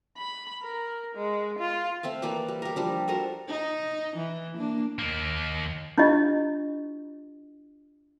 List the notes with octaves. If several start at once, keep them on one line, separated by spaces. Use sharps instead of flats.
B5
A#4
G#3
F4
A3 C4 E5 F5
E3 A#3 B4 D5
G3
G4 A#4
F3 G3 D4
F#4 A4 A#4 C5
D#4
E3
A#3 D4
D#2 A#3
D4 E4 F4 G4 D#5